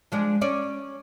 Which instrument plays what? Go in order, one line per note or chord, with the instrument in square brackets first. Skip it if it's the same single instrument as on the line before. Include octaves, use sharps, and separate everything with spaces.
[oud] F3 G#3 D4
C#4 D5